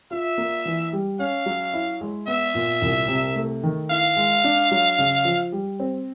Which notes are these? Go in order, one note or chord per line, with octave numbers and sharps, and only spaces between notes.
F4 E5
A#3
E3
G3
C#4 F5
F#3
E4
G#3
B3 E5
A#2
C2
C3
A3
D#3
E4 F5
G#3
D4
F#3
C#3
F3
G3
C4